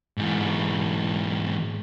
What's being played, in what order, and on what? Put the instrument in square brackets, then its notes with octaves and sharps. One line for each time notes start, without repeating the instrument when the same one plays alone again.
[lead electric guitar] G#2 E3